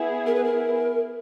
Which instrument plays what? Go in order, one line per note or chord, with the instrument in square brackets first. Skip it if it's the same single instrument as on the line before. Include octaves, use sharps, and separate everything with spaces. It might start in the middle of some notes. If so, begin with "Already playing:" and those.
Already playing: [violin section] B3 E4 G#4
[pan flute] A#4
B4
A#4